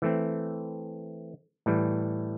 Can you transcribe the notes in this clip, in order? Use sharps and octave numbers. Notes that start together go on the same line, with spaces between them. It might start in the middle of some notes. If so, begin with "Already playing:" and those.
E3 A3 C4
A2 E3 G3